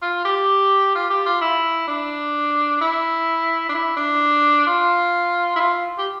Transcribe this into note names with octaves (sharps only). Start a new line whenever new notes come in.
F4
G4
F4
G4
F4
E4
D4
E4
D4
E4
D4
F4
E4
F4
G4